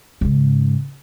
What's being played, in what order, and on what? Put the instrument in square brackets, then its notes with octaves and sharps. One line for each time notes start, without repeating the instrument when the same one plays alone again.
[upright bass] G#2 C#3